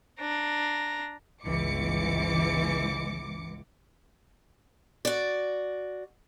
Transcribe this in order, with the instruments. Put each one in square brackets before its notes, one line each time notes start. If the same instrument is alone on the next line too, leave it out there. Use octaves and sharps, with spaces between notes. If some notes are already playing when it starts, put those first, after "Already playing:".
[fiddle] D4 A#5
[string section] G1 C#2 E3 D6 C#7
[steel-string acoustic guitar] F#4 D5